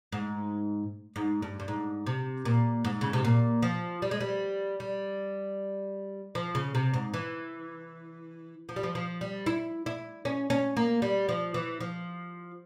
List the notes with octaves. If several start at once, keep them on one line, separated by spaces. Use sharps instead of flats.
G#2
G#2
G2
G2
G#2
C3
A#2
G#2
C#3
C3
A#2
F3
G3
G#3
G3
G3
F3
C#3
C3
G#2
E3
F3
G3
F3
F3
G3
E4
E4
C#4
C#4
A#3
G3
F3
E3
F3